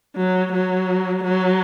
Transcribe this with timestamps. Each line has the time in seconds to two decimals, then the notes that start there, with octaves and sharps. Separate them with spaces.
0.16 F#3
0.53 F#3
1.24 F#3